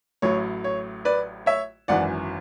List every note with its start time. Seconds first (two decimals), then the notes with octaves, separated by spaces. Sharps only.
0.22 A1 A2 F#3 C#5
0.64 C#5
1.05 B4 D5
1.46 C#5 E5
1.88 G#1 F#2 E3 D5 F#5